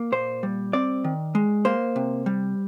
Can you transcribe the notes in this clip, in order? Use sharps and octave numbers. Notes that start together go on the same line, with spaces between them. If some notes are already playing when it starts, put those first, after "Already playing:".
Already playing: A#3
A#2 C5
G3
C4 D5
D#3
G#3
A#3 C5
C3
G3